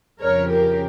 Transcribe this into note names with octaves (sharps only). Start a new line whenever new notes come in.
F2 C#3 F3 A#4 C#5
G4 A#4